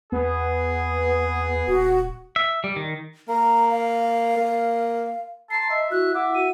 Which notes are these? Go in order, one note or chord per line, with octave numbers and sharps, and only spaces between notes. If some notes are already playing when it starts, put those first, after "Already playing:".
E2 B3 G#4
D#1 F#4
E5
G3
D#3
A#3 A#5
F5
A#3
A5 A#5 C6 C7
D#5 E5
E4 F#4 F#6
E5 F#5 D6
F#4 D#7